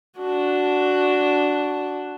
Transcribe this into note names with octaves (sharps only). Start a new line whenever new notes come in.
D4 F#4